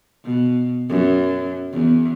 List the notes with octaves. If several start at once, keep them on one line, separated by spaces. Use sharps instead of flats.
B2
F#2
E2